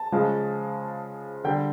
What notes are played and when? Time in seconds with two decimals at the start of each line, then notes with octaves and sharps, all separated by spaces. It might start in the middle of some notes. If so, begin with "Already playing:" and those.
Already playing: A5
0.12 C#3 F3 G#3
1.44 D3 G3 G5